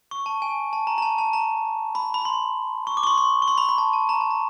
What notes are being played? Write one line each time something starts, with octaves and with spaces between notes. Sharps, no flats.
C#6
A5
G#5
A5
A#5
A#5
A5
A5
A#5
B5
B5
C6
C#6
D6
C#6
C6
C6
C#6
C6
B5
B5
A5
A5
A#5
A5
A#5